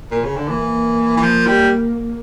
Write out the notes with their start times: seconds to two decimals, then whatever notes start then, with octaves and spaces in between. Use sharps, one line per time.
0.11 A#2
0.24 C#3
0.36 D3
0.49 E3 A#3
1.17 E3
1.22 F3
1.47 G3